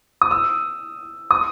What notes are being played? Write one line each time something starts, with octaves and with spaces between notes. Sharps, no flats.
D#6
E6
D#6